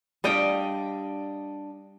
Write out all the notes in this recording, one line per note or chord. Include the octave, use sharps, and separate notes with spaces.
G3 D4 G4 D#5 F5 G5